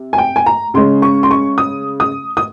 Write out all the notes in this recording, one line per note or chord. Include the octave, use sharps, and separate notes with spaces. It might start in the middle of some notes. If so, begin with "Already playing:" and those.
Already playing: C3
G#5
G5
G#5
A#5
C#3 G#3 C#4 C6
C#6
C6
C#6
D#6
D#6
D#6